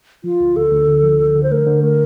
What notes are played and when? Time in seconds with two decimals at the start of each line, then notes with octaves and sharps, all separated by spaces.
0.24 F3 F4
0.40 D2
0.56 D2 A4
0.72 D2
0.88 D3
1.03 F3
1.19 D2
1.35 D3
1.43 C5
1.51 A3 A#4
1.67 D3
1.83 A3 A#4